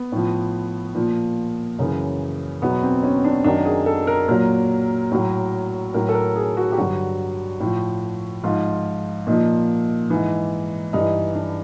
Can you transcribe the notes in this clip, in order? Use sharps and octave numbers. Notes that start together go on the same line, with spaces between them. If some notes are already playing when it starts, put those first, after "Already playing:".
Already playing: B3
A2 F3
A#2 F3
F#2 C#3 E3
E2 B2 F#3 B3
C4
C#4
D4
F#2 D#3 F#3 D4
G#4
A4
A#4
A#2 F#3 A#4
A2 F#3
A2 F#3 A#4
A4
A#4
G#4
F#4
G4
G2 D3 F#3 F#4
A2 F3
G#2 F3 F4
A#2 F3 D#4
G#2 E3
G2 E3 D#4
D4